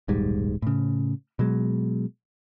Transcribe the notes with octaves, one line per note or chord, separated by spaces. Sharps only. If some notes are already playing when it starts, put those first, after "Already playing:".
D#1 B1 G#2 G3
A2 C#3
B2 F#3 G#3